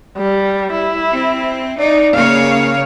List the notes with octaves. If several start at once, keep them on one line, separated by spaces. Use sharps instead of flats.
G3
E4
C4
D#4 D5
C#3 A#3 C#5 F5